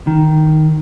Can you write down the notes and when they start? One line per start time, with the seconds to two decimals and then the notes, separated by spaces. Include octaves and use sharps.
0.07 D#3